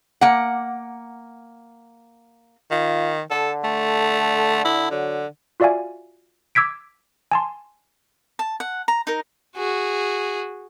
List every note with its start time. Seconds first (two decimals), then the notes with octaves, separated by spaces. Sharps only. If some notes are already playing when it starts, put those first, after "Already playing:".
0.21 A#3 F#5
2.71 D#3 F4
3.31 D3 A4
3.64 A3
4.65 E4
4.91 D3 F#3
5.60 F4 F#4 D5 E5 F5 G#5
6.55 D6 E6 G#6 B6 D7
7.31 G#5 A5 C6
8.39 A5
8.60 F#5
8.88 A#5
9.07 D#4 A#4
9.56 F#4 G#4